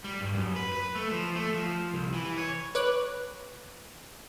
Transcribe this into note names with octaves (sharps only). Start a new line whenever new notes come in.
G3
G2
F#2
B4
B4
A3
F3
A3
F3
C2
E3
C#5
B4 C#5 D6 F#6